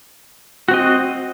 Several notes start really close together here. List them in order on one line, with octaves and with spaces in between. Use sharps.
F#4 C4 D#5